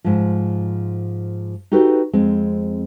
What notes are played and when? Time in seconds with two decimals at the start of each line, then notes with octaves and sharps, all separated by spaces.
0.04 G#2 F3
1.72 D#4 F#4 G4 A4 B4
2.13 F2 G#3 C4